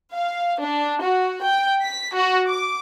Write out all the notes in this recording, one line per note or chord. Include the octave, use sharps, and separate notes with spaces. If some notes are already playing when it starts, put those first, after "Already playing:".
F5
D4
F#4
G5
B6
F#4
D6